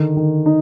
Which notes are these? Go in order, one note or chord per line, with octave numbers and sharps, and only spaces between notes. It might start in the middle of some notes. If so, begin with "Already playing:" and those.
Already playing: D3 D#3
D#3
D#4